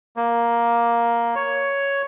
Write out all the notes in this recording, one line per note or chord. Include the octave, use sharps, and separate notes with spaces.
A#3
C#5